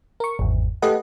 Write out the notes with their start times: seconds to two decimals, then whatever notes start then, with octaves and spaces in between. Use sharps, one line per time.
0.20 A#4 C#6
0.39 G#1 E2
0.82 A3 G4 A4 B4 D#5 F#5